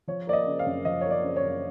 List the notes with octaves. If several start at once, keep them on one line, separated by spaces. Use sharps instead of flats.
F3 C#5
A#3 D5
D#5
C#3
F5
F#2
F3 D#5
A#3 C#5
D5
C#3
C#5
F#2